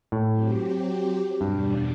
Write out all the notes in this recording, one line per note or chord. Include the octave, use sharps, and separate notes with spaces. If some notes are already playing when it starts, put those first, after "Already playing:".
A2
F#3 C4 G4
E2 G2 B2 G3 D4